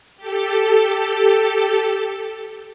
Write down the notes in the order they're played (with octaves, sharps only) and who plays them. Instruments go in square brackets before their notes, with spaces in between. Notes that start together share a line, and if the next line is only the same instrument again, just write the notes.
[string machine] G4 A4